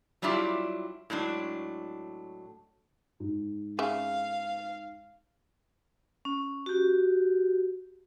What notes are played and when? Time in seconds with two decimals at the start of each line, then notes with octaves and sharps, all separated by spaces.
0.22 F#3 G3 D4 E4 F4 G4
1.10 A2 F#3 G#3 D4
3.20 G#2
3.79 C#3 E5 F5
6.25 C#4
6.66 F#4 G4